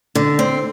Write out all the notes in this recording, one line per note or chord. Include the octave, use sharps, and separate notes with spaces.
D3
C4